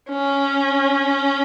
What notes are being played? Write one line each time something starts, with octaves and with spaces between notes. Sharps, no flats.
C#4